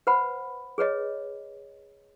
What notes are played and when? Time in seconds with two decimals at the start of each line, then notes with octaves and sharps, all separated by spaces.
0.07 B4 C5 F#5 B5
0.78 G#4 B4 C#5 D#5